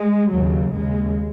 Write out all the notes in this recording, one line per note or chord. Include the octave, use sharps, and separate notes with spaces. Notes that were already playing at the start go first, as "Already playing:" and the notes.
Already playing: G#3
D#2 C#3 F#3
D#2 C#3 G#3